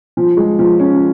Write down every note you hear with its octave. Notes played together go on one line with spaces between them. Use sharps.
F3
G#3
F3
C#4